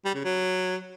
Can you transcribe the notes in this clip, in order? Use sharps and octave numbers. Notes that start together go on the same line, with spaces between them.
G3
C#3
F#3